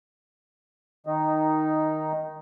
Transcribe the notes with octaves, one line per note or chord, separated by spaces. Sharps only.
D#3 D#4